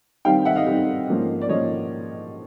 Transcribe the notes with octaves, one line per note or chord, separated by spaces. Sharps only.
D#3 G3 C4 D#4 F5 G5
E5 F#5
D#5 F5
D#3 G3 C4 D#4
G#2 F3 A#3 C#4
D5
G#2 F3 A#3 C#4 C#5 D#5